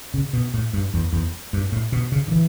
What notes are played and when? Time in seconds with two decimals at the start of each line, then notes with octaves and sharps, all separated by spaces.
0.14 C#3
0.33 B2
0.54 A2
0.73 G2
0.94 E2
1.13 E2
1.53 G2
1.72 A2
1.92 B2
2.12 C#3
2.28 D3
2.31 E3